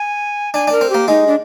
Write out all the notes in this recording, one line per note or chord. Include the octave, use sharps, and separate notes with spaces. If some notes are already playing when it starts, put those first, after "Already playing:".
Already playing: G#5
D4 G#5
D4 A#4
C4
A#3 G4
G#3 D#4
D4